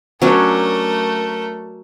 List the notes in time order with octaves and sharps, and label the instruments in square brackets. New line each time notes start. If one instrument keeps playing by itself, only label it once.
[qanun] F#3 C#4 D4 [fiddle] A3 A#4